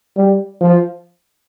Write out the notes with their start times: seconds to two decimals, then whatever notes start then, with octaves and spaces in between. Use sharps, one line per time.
0.17 G3
0.61 F3